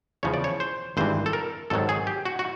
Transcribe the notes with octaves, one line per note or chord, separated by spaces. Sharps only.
E2 C#3 F3 C#5
D5
C#5
C5
G#1 G2 E3 C5
A4
A#4
G#1 G#2 D#3 F#3 A4
G#4
G4
F#4
F#4